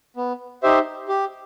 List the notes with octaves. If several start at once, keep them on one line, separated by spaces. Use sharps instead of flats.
B3
D#4 G4 C5 E5
G4